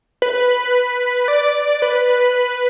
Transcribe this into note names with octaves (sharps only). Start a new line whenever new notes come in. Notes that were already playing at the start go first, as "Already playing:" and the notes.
B4
D5
B4